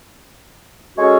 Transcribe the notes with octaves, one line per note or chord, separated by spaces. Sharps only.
G#3 C#4 F#4 A4 C#5